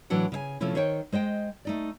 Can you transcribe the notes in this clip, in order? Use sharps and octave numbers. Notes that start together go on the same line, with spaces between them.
A2 E3 F#3 D4 F#5
C#3 E5 G#5
C3 F3 A3 C#4 E4
D#3 C5 C#5 E5 G5
G#3 C5 D#5 G5
A3 D#4 D5